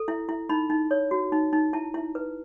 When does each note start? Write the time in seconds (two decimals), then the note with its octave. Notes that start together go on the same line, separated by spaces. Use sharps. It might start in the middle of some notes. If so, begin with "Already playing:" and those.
Already playing: A4
0.08 E4
0.29 E4
0.49 D#4 B5
0.70 D#4
0.91 C#5
1.11 F#4
1.32 D#4
1.53 D#4
1.73 E4 A5
1.94 E4
2.15 B4